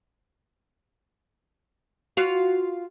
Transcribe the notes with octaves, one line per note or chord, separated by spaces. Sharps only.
F4 F#4 F5